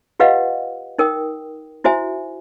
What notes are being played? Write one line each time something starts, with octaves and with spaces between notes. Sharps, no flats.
F4 G4 B4 D#5 F5 F#5
D#4 A#4 G5 D#6
E4 F#4 C5 E5 G#5